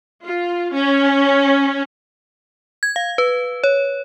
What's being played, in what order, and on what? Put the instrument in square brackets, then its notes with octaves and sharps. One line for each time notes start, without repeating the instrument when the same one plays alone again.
[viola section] F4
C#4
[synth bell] G#6
F5
B4
C#5